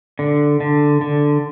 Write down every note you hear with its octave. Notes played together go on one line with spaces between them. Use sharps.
D3
D3
D3